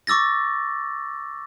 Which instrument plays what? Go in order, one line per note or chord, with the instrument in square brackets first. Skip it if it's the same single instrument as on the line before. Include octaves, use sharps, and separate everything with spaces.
[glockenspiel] C#6 D6 E6 A6 A#6